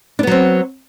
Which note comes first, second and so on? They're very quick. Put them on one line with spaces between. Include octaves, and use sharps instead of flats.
D4 B3 F#3 C4